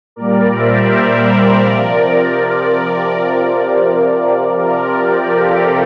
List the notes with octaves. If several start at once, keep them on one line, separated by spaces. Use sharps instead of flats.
A#2 G3 A#4 D5
C5 E5
A#4 D5
C3 F3
A#4 D5
C3 F3
C3 F3 A#4 D5
G4 A#4
F4 A4